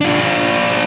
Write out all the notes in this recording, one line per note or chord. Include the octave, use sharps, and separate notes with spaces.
D4 F4